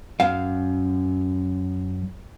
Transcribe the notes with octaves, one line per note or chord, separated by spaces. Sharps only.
F#2 F5